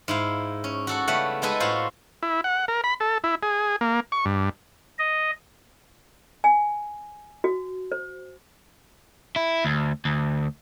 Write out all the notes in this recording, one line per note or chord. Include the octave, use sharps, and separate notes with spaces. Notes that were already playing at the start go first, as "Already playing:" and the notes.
G#2 E4 F5
C#4
F#4 A4 F#5
C#3 G3 A3 B3 F#5
G#3 D#4 G#4 A4 B4 G#5
A2 F4 F#4 C5
E4
F#5
A#4
B5
A4
E4
G#4
A#3
C#6
G2
D#5
G#5
F#4
C5
E4
D2
D2